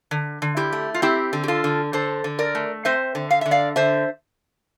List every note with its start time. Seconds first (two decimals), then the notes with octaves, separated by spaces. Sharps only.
0.11 D3
0.42 D3
0.57 E4 G4
0.72 A3
0.94 F4
1.02 C4 E4 G4
1.33 D3
1.44 G4
1.48 F4 A4
1.64 D3
1.93 D3 A4 C5
2.24 D3
2.39 A#4 D5
2.55 A3
2.85 C4 C5 E5
3.15 D3
3.31 F5
3.41 D3 E5
3.51 D5 F5
3.76 D3 C5 E5